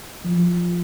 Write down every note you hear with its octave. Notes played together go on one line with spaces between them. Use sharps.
F3